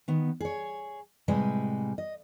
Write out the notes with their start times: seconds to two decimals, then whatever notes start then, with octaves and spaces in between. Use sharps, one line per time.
0.08 D#3 B3
0.40 G#4 C#5
1.28 A2 C3 G3 G#3 B4 G#5
1.98 D#5